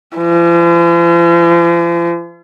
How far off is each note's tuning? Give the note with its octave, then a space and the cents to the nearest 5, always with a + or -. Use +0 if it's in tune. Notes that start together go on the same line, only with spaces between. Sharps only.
F3 -45